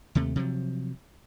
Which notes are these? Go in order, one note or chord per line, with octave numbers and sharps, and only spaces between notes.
D#2 C3 A3
C3 F3 F#3